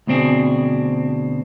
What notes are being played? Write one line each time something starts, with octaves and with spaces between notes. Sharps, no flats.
D2 B2 C4 D4 G#4